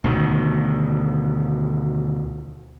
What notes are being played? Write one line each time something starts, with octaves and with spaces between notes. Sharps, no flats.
D2 B2 D#3